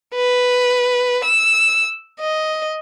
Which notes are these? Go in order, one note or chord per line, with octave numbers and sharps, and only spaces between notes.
B4
E6
D#5